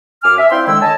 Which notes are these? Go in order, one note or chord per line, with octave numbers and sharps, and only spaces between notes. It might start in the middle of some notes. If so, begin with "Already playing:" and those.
F#2 G#5 D6 F6
E5
C4 E4 D5 F5 G5 C6
D3 D#3 G#3 E4 E6
C#5 D#5 G#5 A5